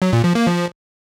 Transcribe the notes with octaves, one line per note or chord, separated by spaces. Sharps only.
F#3
A#2
F3
A#3
F3